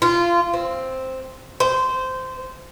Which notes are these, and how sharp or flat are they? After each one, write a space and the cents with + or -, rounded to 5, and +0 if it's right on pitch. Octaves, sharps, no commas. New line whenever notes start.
F4 -20
C4 +0
C5 -15